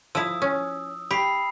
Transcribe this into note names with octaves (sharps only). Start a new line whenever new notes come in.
F3 E4 D#6 E6
C#4
G4 B5 C7